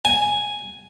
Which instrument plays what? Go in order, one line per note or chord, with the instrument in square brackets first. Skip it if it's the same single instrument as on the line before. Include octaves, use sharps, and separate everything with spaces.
[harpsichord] G#5